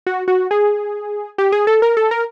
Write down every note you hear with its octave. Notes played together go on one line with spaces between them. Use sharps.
F#4
F#4
G#4
G4
G#4
A4
A#4
A4
A#4